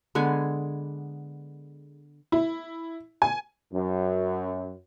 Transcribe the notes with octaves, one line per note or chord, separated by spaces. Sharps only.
D3 G#3 B3 G#5
E4
G#5
F#2